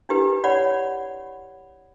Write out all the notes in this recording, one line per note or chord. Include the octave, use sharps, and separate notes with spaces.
D4 E4 G4 B4
C#5 D5 F#5 B5